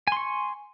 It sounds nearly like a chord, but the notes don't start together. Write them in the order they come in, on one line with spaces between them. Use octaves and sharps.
G#5 C6 C#6